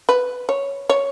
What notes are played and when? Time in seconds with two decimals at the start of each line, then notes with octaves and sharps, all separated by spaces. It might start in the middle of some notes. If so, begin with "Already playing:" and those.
0.09 B4
0.49 C#5
0.89 C#5